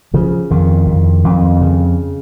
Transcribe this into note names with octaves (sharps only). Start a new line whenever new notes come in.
C#3 F3
F2 D#3
F2
F2
C#3